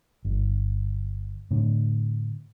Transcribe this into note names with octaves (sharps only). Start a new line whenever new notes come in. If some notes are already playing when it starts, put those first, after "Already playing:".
G1
A2 D3